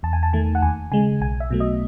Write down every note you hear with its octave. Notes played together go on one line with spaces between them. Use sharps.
E2 A5
G#5
A5
D#3 A3 A5
F#5
D#2 G#5
C#3 G#3 G#5
B1 G#5
E5
B2 F#3 A3
D#5